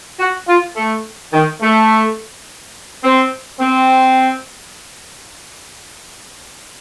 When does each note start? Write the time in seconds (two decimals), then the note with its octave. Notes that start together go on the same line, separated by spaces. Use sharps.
0.19 F#4
0.48 F4
0.76 A3
1.33 D#3
1.61 A3
3.04 C4
3.60 C4